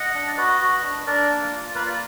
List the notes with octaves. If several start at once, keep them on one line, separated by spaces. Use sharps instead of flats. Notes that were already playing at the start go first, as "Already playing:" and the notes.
Already playing: D#5 F#5
D4
D5
F#4 B4 D#5
F#4
D4
D4 A#4 D5
A#3
F4
A#3 B4
D5